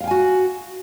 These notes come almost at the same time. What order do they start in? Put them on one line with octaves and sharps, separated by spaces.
F5 G5 G#5 F#4